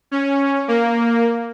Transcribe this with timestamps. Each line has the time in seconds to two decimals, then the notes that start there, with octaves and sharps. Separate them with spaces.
0.11 C#4
0.68 A#3